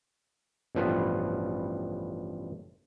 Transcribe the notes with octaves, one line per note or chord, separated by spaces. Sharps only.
A1 G2 B2 F3 B4